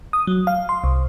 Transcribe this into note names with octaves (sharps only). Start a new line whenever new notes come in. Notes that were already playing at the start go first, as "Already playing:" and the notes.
D#6
F#3
F5
C6
C2